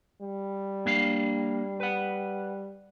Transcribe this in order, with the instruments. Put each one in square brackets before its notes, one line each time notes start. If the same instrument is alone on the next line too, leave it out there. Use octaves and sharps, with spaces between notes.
[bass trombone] G3
[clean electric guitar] A#3 D4 F5
B4 F#5